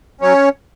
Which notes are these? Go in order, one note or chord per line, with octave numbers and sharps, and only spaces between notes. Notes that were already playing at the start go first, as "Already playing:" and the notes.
F#3 C#4 C#5